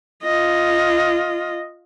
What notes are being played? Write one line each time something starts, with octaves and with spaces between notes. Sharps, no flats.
F4 D#5